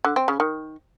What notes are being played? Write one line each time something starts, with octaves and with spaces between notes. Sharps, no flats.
D3
C4
C#3
D#3